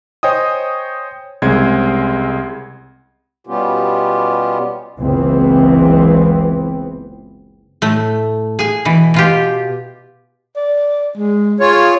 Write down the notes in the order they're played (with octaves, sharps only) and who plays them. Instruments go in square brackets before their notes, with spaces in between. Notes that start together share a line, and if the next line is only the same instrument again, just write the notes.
[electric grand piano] C5 C#5 D#5 G5 G#5 D#6
C2 C#3 G#3 C4 G#6
[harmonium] B2 G3 B3 C#4 F4 G4
[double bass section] F#1 C#2 E3 B3 C4
[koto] A2 A3
G#4 G#5
B2 E3
B2 F4 G4
[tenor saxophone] D5
G#3
[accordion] F4 C#5 [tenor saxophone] G#4